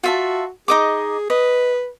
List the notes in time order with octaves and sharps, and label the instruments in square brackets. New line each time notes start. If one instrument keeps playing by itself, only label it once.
[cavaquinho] F4 E5 A5 [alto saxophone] F#4
[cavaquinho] D#4 D#5 D6 [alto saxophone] G#4
[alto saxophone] B4 [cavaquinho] D#5